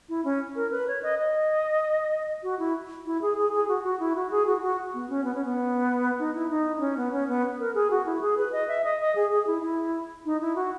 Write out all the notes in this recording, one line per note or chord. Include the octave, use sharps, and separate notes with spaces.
E4
C#4
A#4
B4
C#5
D#5
D#5
F#4
E4
E4
G#4
G#4
G#4
F#4
F#4
E4
F#4
G#4
F#4
F#4
B3
C#4
B3
C#4
B3
D#4
E4
D#4
D#4
C#4
B3
C#4
B3
A#4
G#4
F#4
E4
G#4
B4
D#5
E5
D#5
D#5
G#4
G#4
E4
E4
D#4
E4
F#4